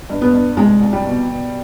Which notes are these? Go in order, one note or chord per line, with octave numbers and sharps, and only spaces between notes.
G2
B3
G2
C2 G#3
C2
G3
B2
B2